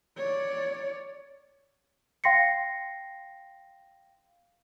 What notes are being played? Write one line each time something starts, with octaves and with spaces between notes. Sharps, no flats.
C#5 D5
F5 G5 C6 A#6 C7 C#7